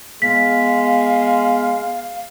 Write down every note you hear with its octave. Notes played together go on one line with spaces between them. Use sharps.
G#3 B3 F5 B6